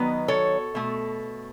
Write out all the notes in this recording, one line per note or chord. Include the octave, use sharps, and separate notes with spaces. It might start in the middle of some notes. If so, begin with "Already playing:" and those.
Already playing: D#3 F#3 B3 B4 D#5
A4 C#5
B2 A3